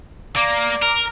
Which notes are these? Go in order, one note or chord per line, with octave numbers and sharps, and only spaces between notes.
A#3 D5
A#4